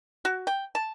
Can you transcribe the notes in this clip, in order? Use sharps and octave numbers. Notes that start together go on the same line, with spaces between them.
F#4
G5
A5